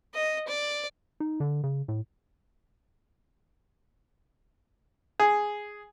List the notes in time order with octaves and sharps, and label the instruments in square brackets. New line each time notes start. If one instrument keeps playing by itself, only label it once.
[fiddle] D#5
D5
[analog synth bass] D#4
D3
C#3
A2
[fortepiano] G#4